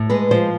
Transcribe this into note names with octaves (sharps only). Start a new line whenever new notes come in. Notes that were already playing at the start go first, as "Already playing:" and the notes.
Already playing: A2
G#3 B4
F3 C5